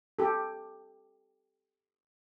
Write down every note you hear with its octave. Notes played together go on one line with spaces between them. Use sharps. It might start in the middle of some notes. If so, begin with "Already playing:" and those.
G4 A4